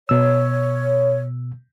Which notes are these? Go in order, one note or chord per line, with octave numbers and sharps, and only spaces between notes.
B2 C#5 E6